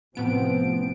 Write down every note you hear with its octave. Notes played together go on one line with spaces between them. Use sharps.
A1 C3 F3 B3 C4 D7